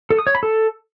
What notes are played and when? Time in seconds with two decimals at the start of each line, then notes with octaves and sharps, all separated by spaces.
0.10 A4
0.19 D#6
0.27 C#5
0.35 B5
0.43 A4